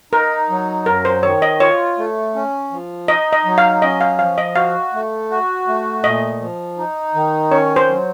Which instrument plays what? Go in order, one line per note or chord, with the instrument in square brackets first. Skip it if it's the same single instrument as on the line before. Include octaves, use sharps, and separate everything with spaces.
[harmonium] D#4 [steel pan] A#4
[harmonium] F#3
[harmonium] F#2 [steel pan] A#4
[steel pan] C5
[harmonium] D#3 [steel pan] C#5
[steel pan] D#5
[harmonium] F4 [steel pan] C#5
[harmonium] A3
C#4
F3
[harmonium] D#4 [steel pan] D#5
[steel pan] D#5
[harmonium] F#3
[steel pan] F5
[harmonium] C#4 [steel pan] D#5
[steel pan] F5
[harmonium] F3 [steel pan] F5
[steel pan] D#5
[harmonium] F#4 [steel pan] F5
[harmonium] A3
F#4
A3
[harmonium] A#2 [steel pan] D#5
[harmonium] F3
D#4
D#3
[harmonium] C#4 [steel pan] C#5
[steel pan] C5
[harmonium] F#3